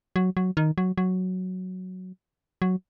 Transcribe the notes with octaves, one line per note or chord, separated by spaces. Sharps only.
F#3
F#3
D#3
F#3
F#3
F#3